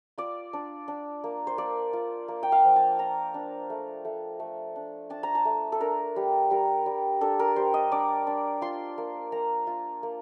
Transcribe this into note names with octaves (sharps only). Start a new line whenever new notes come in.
F4 D5
D4
D4
A#3
C5
A#3 D5
F4
A#3
G5
F5
F3
A5
F4 A#5
D4
A3
A3
A3
D4
D4 A5
A#5
A5
A3
A4
D4 A#4
G3
G3 A#4
G3
D4 A4
A#4
G3 C5
D#5
D4 D5
D4
F4 C6
A#3
A#3 A#5
F4
A#3